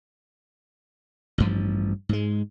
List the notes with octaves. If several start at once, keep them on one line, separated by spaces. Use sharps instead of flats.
A1 G2 F3
G#2 G#3